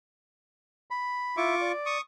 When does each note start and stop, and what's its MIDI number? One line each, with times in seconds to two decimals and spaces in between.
0.91 1.36 83
1.37 1.55 64
1.37 1.72 65
1.37 1.55 76
1.37 1.72 85
1.37 1.72 86
1.61 1.98 74
1.86 2.01 85
1.86 2.01 87